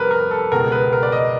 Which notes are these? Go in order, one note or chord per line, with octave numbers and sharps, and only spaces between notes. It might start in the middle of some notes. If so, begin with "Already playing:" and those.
Already playing: F1 F2 G3 A#4 B4
A#4
A4
C#2 B2 G#3 A#4
B4
A#4
D5
D#5